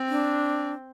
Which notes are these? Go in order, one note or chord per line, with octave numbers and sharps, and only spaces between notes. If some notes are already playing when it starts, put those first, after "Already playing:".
Already playing: C4
D4